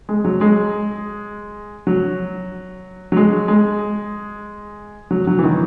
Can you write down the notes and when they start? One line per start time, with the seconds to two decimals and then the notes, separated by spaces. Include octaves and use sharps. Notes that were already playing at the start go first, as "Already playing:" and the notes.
0.09 G#3
0.24 F#3
0.41 G#3
1.87 F#3
3.12 F#3
3.17 G#3
3.48 G#3
5.11 F#3
5.27 F#3
5.39 E3
5.44 D#3